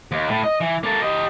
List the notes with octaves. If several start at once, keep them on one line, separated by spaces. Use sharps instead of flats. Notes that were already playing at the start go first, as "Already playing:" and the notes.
D#2
A2
D#5
E3
A#3 A4
G4 D#5